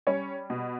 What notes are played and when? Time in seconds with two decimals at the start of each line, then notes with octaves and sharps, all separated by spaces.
0.07 G3 C#4 C#5
0.50 B2